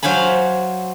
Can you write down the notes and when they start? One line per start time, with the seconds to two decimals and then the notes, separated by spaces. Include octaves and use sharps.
0.03 F#3 C5 F5 G#5 B5